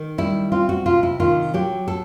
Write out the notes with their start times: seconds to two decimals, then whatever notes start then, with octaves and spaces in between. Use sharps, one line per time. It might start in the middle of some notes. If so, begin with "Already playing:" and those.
Already playing: D#3
0.18 G3 E4
0.52 C4 F4
0.69 F#4
0.85 C3 F4
1.03 E4
1.20 D#3 F4
1.54 F#3 G4
1.88 A4